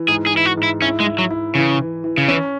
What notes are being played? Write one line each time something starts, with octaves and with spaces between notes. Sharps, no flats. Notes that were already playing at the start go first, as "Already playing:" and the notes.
Already playing: E3
G#2 G#4
G#4
E3 E4
F#4
G#2
E4
C#4 E4
G#3
E4
F#3
E4
C#3 E3
E3
E3
C#3
E3 C#4